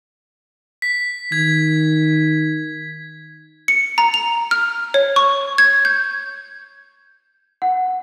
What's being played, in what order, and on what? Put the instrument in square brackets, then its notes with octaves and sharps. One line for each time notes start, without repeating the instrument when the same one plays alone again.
[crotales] B6
[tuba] D#3 [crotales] G#6
[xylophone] C#7
A#5
F7
F6
C#5
C#6
G#6
G6
[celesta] F#5